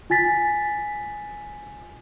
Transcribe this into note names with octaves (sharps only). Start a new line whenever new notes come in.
F4 G#5 A6 B6